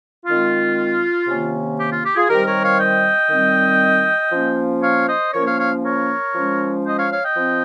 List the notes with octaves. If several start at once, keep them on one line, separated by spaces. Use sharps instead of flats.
D#3 G#3 C4 F4
C3 D#3 A#3 C#4
G4
F4
G4
F4 G#4
D#3 G3 C4 G4 A#4
A#4 C#5
C#5 F5
D#5 G5
D#3 G3 C4
F3 A#3 C#4
C#5 F5
C5 D#5
F3 A#3 C#4 A#4 C#5
C#5 F5
C#5 F5
A#4 C#5
F3 G#3 C#4
C5 D#5
C#5 F5
C#5 F5
D#5 G5
F3 C4